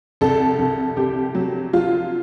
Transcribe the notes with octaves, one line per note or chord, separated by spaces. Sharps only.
C2 A4
C2
C2 G4
F#3
F#3 F4